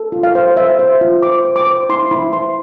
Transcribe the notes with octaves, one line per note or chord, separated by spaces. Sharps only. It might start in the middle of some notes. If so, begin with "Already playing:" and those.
Already playing: A4
F4
F5
C5
C5 E5
C5
F4
C5 D6
C5
D6
C5
E4 C6
E4 B5
C5 C6